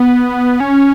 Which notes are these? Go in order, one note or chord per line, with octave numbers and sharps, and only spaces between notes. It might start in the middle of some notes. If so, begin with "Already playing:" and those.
Already playing: B3
C#4